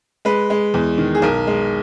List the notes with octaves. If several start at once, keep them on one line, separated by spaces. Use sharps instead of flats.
G#3 B4
G#3
E2
D#3
G#4
B1 A#4
G#3